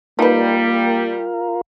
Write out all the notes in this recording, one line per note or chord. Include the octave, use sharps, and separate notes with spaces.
G3 A#3 D#4 F4 A#4 B4